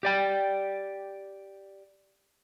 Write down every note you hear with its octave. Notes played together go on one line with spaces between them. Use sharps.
G4 D5 G5